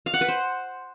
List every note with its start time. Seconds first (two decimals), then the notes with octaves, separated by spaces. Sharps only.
0.06 F5
0.14 F#5
0.21 B4
0.28 C5